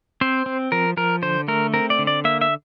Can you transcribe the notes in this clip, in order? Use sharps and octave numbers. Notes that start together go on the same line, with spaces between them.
C4 C5
C4
F3 A#4
F3 A#4
D3 C5
A3 A#4
C4 A#4
D5
D3
D5
A#3 E5
E5